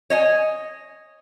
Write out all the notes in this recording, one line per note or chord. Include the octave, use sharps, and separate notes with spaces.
C#5 D#5 G#5